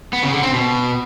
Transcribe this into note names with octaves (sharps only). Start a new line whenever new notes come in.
B3
C#3
D3
C4
B2